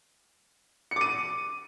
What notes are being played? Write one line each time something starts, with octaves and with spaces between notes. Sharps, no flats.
D6 C#7 D#7